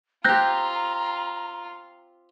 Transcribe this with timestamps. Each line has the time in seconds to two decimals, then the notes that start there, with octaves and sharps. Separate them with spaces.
0.25 C4 F4 G4 A#5 F#6 G6 A#6